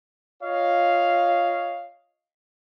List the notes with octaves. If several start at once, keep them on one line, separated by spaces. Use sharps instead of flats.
F4 C#5 D#5 F5